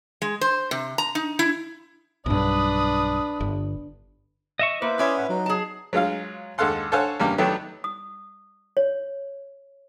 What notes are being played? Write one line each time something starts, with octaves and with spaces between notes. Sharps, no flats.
G#3
C5
C3
A#5
D#4
E4
B1 G2 D4 B4 D#6
G1
D#5 E5 C#6
A#3 E4 B4 C5 D6
C#4 E4 E5 C6 D6 D#6
A2 F#5
F#3 D#4
G#4 A5
F#3 G#3 F4 F5
D#2 G#3 A4 F5 F#5 C6
A4 C5 C#5 F5 F#5 G#5
E2 C#3 G3 A#3
D#3 F#3 A3 B3 D4 G4
D#6
C#5